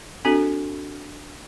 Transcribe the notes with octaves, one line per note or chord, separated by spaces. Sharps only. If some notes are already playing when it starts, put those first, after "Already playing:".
C4 D4 F#4 A4